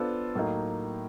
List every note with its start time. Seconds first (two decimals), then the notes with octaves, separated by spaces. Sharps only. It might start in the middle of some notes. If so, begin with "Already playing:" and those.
Already playing: B3 D4 F4 A4 C5
0.35 A2 F#3 A#3 D#4